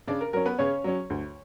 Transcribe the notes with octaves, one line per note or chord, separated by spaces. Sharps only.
C#3 D4 D5
A#4
F#3 C#4 A#4
B3 B4
C#3 C#4 C#5
F#3 C#4
D2